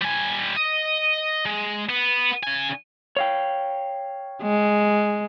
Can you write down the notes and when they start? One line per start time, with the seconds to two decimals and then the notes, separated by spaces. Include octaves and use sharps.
0.02 G3 G#5
0.57 D#5
1.46 G#3
1.89 B3
2.43 C#3 G#5
3.17 C#5 F5 G5
4.42 G#3